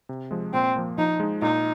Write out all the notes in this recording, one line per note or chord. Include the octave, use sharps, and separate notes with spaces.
C3
F3 G#3
A#2 C4
F3 A#3
F3 D#4
G#3 D#4
A#2 D#4